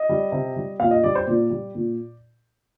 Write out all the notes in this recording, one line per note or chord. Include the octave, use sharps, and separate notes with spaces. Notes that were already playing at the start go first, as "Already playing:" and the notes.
Already playing: D#5
G3
C3
G3
A#2 F5
D#5
G3 D5
C5
A#2 D5
G3
A#2